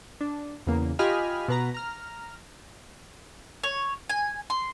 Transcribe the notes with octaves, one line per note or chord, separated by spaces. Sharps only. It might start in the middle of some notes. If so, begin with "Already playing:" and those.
D4
E2 C#3 A#3
F4 G4 D#5 G#5 B5 F6
B2 B4 A#5
A#5 F6
C#5
G#5
C6